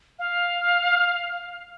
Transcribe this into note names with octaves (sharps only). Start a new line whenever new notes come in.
F5